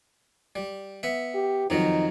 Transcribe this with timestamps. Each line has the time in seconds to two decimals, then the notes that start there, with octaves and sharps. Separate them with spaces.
0.56 G3
1.03 B3 E5
1.34 G4
1.70 F2 D#3 F#3 D#4